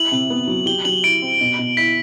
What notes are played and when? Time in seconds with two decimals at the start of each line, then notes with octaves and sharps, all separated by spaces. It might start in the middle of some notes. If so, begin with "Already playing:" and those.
Already playing: E4 F#7
0.12 C3
0.30 B3
0.47 F#3
0.66 G4 G7
0.85 F#3 F#7
1.03 E4 D7
1.22 C4
1.41 B2
1.59 B2
1.77 E4 B6